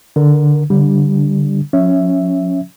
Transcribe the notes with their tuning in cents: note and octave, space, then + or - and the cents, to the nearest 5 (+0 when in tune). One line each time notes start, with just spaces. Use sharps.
D3 +0 A#4 +0
D3 -20 G3 +0 D4 +0
F3 +40 C#4 +0 E5 +0